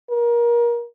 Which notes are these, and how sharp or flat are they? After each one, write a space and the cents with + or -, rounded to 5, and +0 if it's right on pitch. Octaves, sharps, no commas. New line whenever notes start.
A#4 +25